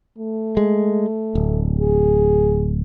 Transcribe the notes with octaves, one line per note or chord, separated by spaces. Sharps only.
A3
G#3
D1
G#4